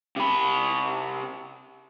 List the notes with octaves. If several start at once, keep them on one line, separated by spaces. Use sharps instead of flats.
C3 B5